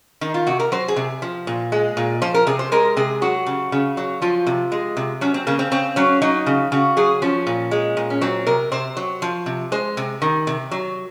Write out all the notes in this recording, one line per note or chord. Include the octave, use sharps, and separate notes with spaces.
D#3 D#4
F4
C3 F#4
A#4
F#3 C5
G#4
C3
F3
A#2
G#3
A#2
F3 C5
A#4
C3 G#4
C5
G#3 A#4
C3 G#4
F#3 F#4
C#3
C#3
F#3
F3 F4
C3
G#3
C3
F#3 C#4
C4
C#3 A#3
C4
C#3 C4
F#3 C#4
F#3 D#4
C#3
C#3 F#4
F#3 G#4
F3 C#4
A#2
G#3
A#2
C#4
F#3 C4
C3 A#4
C3 C5
F#3
F3
C3
G#3 C5
C3
D#3
C3
F#3